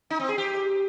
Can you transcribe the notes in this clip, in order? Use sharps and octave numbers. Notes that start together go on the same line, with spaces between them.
D#4
C4
G#4
G4